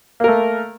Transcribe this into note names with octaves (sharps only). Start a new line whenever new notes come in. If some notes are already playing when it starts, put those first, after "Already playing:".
A3 A#3 A#4